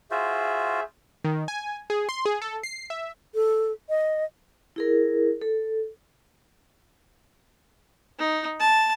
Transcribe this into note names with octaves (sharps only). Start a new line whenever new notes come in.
F4 F#4 G#4 C5 E5
D#3
G#5
G#4
C6
G#4
A4
C7
E5
A4
D#5
E4 G#4 A#4
A4
D#4
A5